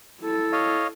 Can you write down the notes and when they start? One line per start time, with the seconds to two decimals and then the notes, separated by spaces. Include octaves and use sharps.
0.21 E4 A4
0.52 C#5 D#5 F5